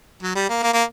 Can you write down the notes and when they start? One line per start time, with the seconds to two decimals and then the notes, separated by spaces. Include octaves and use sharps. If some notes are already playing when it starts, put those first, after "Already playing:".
0.22 F#3
0.35 G3
0.49 A#3
0.63 A#3
0.73 A#3